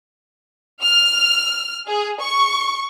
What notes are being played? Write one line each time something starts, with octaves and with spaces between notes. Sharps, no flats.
F6
G#4
C#6